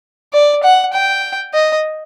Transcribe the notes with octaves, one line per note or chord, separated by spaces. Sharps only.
D5
F#5
G5
D#5